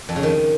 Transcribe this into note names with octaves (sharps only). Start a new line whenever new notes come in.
F2
C#3
D#3